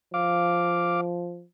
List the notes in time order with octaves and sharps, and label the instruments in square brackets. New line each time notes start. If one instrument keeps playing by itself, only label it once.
[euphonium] F3 [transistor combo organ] F5 D6